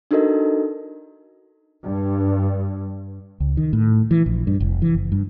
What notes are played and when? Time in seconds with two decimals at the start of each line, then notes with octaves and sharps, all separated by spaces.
0.11 D4 D#4 F#4 A4 A#4 D#5
1.84 G2
3.40 C#2
3.57 D#3
3.73 A2
4.11 E3
4.26 A#1
4.47 G2
4.60 F1
4.82 E3
4.94 F#1
5.12 G2